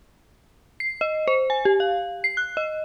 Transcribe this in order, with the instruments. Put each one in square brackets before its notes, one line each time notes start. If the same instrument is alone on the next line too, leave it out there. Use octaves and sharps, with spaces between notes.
[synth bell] C7
D#5
C5
G#5
G4
F5
C7
F#6
D#5